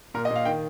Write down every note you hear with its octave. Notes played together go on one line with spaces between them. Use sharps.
A#2 A#4
D#5
A#2
F5
D#3 G5